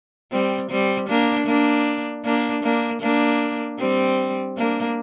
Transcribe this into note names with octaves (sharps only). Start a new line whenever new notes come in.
G3 C4
G3 C4
A#3 D4
A#3 D4
A#3 D4
A#3 D4
A#3 D4
G3 C4
A#3 D4